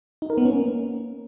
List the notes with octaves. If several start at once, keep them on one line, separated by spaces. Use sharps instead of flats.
D#4
A#4
B3
C#4
A#3